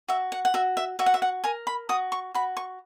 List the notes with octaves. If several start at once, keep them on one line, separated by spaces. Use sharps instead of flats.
F#4 E5
F#5
F#5
F#4 E5
E5
F#4 E5
F#5
E5
F#5
A#4 G#5
B5
F#4 D#6
C#6
F#4 B5
C#6